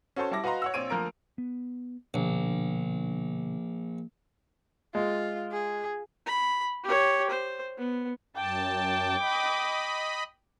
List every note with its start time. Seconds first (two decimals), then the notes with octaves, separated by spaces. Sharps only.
0.16 C#4 F#4 A4 C5 A5 C#6
0.31 G3 E4 A5 D6 A#6
0.44 F#4 B4 D#5 F5 A#5 C6
0.62 C#5 F#5 E6
0.74 A#1 C4 C#5 D7 D#7
0.90 D2 F3 A#3 A#4 A#5 D7
1.38 B3
2.14 A#1 B2 D3
4.95 G#3 F4
5.52 G#4
6.27 B5
6.84 G4 C#5
7.30 C5
7.78 B3
8.36 F#2 G5 A5 D6
9.20 D#5 B5